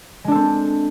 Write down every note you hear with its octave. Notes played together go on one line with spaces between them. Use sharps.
G#3 C4 D4 A4